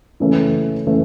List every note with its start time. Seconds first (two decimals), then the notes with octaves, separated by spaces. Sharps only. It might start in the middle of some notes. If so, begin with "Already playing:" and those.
0.20 C#3 E3 A3 C#4
0.86 C#3 E3 A3 C#4